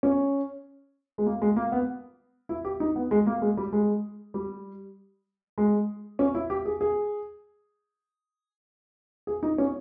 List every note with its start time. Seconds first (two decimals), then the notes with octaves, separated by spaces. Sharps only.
0.03 C#4
1.18 G#3
1.26 A#3
1.42 G#3
1.56 A#3
1.72 B3
2.49 E4
2.65 G4
2.80 D#4
2.96 B3
3.11 G#3
3.27 A#3
3.42 G#3
3.57 G3
3.73 G#3
4.34 G3
5.58 G#3
6.19 C#4
6.35 E4
6.50 G4
6.65 G#4
6.81 G#4
9.27 G#4
9.43 D#4
9.58 C#4